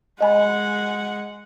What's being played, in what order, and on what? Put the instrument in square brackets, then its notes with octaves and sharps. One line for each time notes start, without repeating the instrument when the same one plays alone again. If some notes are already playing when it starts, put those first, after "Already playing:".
[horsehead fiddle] G#3 F#5 [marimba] D#5 G#5 B5